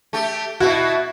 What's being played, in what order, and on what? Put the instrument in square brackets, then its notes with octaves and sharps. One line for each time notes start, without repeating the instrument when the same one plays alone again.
[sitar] A3 G4
[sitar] B2 E4 [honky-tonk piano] F#4